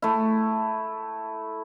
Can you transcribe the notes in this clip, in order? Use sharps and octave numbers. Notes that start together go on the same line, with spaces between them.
A3 E4